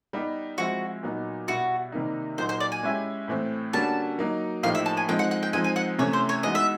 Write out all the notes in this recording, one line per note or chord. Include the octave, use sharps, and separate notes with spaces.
G3 B3 D#4 G4
F3 G#3 C4 E4 F#4
A#2 F#3 B3 D#4
B2 G3 B3 E4 F#4
C3 D#3 G3 A#3 D#4
A#2 F#3 A#3 D#4 F#4 C5
C5
D5
G#5
G#3 C#4 E4 G4
A2 E3 A3 C4
D3 G3 A#3 C#4 F#4 A5
F#3 A#3 D#4
A2 F3 A#3 D#4 G4 F5
E5
A5
G#5
F3 G#3 C4 D#4 G5
F#5
F#5
G5
F3 G#3 C4 D#4 G#5
G#5
F#5
C3 E3 A3 C#4 C#5
C5
C#5
E3 G#3 B3 D#4 F#4 D#5
E5